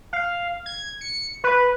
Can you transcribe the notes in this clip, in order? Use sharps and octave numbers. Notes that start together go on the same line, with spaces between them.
F5
G#6
C#7
B4